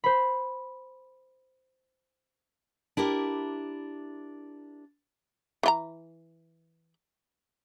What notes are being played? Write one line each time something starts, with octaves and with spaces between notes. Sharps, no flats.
C5 B5
D4 E4 G4 A#4
E3 F4 A#5